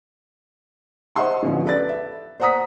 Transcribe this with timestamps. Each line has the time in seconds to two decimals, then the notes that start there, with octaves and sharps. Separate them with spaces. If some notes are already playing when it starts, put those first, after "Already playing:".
1.15 C5 D#5 E5 F#5 C6 C#6
1.43 A1 D3 F3 B3 C#4
1.66 A4 B4 D5 A6
1.89 E5
2.40 C5 D5 F#5 A#5 D#6 B6